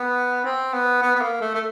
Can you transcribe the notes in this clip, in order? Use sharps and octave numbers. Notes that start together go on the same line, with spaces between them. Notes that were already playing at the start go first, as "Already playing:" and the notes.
Already playing: B3
C4
B3
B3
B3
A#3
A3
A3